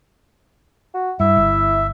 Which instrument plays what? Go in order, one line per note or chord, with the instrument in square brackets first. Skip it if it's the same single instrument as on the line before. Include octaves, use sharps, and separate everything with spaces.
[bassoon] F#4
[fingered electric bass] G2 [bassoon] E4 [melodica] E5
[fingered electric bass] G1